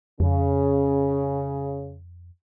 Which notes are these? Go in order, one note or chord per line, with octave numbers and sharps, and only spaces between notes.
F2 C#3